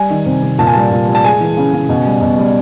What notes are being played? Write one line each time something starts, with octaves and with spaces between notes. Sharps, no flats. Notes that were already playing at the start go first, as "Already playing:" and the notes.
Already playing: G3 G#5
D#3
C3
C3
A#2 A5
G#5
G3 A5
A#2
G3
A5
G#3 G#5
E3
C#3
C#3
B2
G3
B2
G3